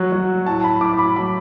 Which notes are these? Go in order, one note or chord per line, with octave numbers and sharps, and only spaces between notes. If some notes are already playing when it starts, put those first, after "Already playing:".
Already playing: F#3 F#4
F#3
A2 A5
B5
A2 D6
B5
F#3 B5